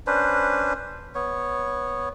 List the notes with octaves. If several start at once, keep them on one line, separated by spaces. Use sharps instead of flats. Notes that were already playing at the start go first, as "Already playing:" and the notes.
C#4 D4 B4 C5
B3 C#5